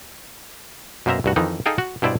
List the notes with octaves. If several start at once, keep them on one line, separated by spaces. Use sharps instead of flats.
F#2 B2 A#3 C5 E5 A#5
C2 G2 F#4
F2 D#3 E3 D#4
D#4 G#4 A4 F5 G5
F#4
G2 B2 E4 C5 D5